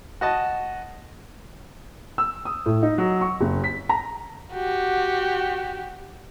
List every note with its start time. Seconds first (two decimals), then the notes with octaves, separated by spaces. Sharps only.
0.21 F#4 D#5 A5
2.18 E6
2.45 D#6
2.66 A2
2.83 D#4
2.98 F#3
3.21 C#6
3.41 F#1
3.64 B6
3.89 A#5
4.53 F#4 G4